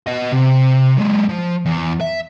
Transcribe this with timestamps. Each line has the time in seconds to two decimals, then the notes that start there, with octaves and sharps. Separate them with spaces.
0.07 B3 D#5
0.32 C3
0.98 F#3 G#3
1.29 F3
1.66 E2
2.01 E5